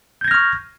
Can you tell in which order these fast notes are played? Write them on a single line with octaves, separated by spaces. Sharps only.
G6 G#6 A#6 F6 C#6